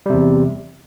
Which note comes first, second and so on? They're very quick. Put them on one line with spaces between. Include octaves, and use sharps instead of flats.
G3 C3 E2